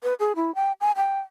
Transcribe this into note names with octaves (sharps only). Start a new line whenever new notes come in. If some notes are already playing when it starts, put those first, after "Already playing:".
B4
G#4
E4
G5
G#5
G5